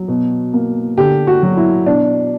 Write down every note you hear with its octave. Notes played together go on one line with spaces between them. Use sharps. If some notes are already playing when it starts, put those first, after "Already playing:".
Already playing: F#3
B2
A#3
D3 G4
F#4
F#3
E4
B2 D4